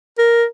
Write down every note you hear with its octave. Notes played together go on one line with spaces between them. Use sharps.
A#4